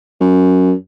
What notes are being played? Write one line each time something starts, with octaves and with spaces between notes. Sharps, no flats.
F#2